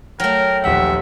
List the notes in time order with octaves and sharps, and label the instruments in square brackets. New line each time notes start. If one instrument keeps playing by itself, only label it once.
[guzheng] F#3 A3 [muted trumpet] A#4 [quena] G5
[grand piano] D#1 A#1 F#5 [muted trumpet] E5